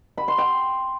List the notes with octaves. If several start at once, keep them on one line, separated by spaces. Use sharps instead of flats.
B5
C6
G5